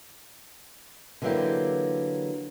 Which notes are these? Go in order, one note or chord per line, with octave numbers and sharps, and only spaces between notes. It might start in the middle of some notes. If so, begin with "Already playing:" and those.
D3 E3 F#3 A#3 E4 G4